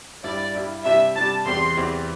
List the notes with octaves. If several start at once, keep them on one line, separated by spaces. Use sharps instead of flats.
G2 G3 E4 G4 D5
G2 G3 E4 G4
C3 G3 D4 G4 E5
C3 G3 D4 G4 A5
E2 E3 C4 G4 C6
E2 E3 C4 G4